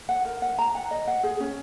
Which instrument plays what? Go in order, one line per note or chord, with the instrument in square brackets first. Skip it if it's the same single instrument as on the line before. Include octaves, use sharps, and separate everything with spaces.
[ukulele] F#5
A#4
F#5
A#5
F#5
D#5
F#5
G#4
C#4